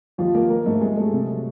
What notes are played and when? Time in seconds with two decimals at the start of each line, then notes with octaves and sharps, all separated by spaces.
0.18 D#2 F3 F4
0.34 D#2 A#3 A#4
0.50 F3 A#3 A#4
0.65 G#2 A3 A4
0.81 G3 G#3 G#4
0.97 G3 A3 A4
1.13 C2
1.29 F#3